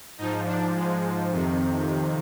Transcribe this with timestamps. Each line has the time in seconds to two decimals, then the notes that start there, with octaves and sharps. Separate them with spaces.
0.18 G#2 F3 D#4
0.46 D4
0.74 G#3
1.31 F2 C3 D#3